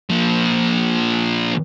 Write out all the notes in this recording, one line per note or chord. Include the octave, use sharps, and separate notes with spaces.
A#2 F3